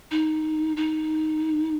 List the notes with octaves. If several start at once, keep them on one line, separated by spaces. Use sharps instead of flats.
D#4
D#4